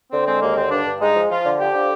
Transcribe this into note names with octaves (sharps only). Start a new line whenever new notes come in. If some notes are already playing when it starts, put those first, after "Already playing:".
D3 C4
G#3 C4
D#2 A#3
D3 C4
G2 D4
G2
G#3 D#4
F3
F3 F4
D3
F3 G4
D3